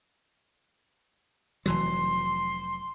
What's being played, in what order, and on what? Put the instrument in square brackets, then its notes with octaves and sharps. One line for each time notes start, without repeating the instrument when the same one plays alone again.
[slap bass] F1 E3 F#3 [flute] C6